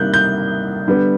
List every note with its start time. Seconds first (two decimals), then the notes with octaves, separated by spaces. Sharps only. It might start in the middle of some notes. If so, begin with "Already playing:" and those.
Already playing: C3 D#3 G3 A#3 F#6 G6
0.14 G6
0.87 D3 G3 B3